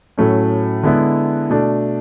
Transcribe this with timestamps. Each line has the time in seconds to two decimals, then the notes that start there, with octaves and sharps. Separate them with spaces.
0.18 A2 F#3 A3 C#4
0.83 D3 G#3 B3 E4
1.50 B2 A3 D4